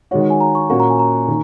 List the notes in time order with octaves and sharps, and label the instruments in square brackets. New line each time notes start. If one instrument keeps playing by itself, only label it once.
[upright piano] D#3 G#3 F#4 [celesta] C#5
[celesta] F#5
G#5
A#5
C#6
[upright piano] A#2 A#3 C#4 F#4 [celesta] C#6
[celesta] A#5
G#5
A#5
[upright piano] D#3